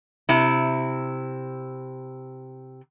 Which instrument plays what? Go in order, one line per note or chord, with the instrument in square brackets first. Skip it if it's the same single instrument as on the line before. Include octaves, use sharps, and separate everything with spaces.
[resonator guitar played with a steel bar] C3 E4